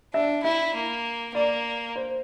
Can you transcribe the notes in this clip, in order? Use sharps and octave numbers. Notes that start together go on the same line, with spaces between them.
D4 E5
E4 E5
A#3
A#3 D5
C5